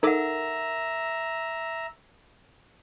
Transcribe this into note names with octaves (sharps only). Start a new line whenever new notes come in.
D#4 A4 A#4 E5 F#5 A#5 D6